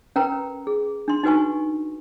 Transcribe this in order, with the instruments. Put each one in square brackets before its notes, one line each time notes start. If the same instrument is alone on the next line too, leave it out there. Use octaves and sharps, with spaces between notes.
[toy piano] C#4 A#4 B4 G5 A#5
G#4
D4 C6
D#4 F#4 B4 G#5 C#6